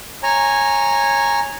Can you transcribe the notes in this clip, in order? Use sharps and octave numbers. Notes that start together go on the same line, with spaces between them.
C#5 G#5 A#5